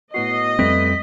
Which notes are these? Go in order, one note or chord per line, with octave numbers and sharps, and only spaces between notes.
A2 B3 F#4 D#5 C7
F2 G3 A3 C4 B4 B6